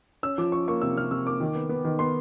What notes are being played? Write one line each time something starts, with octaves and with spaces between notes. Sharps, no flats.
C#4 E6
F3 D6
C#4 C#6
A#3 C#6
C3 E6
C3 F6
C3 E6
A#3 D6
D#3
B3
B3
D#3
B3 C6